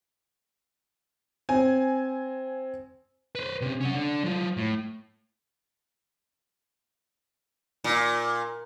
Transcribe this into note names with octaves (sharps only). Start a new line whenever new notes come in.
C4 G#5
B4 C5
C3 C#4
C#4 F#5
D3
F#3 F4
A2
A#2